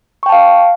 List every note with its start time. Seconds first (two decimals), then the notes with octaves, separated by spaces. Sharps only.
0.23 C#6
0.26 G5
0.29 A5
0.32 F5